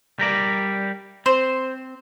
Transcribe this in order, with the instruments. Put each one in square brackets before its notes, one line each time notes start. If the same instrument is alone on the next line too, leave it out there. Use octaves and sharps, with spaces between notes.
[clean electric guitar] G3 A#4 D5
[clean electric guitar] C4 [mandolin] C5